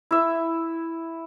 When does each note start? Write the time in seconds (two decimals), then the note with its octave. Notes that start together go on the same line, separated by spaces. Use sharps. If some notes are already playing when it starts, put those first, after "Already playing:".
0.11 E4 E5